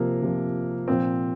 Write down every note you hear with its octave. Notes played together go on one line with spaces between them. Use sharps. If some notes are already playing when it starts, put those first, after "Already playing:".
Already playing: C3 F3 A#3
C3 F3
A#2 F3 C4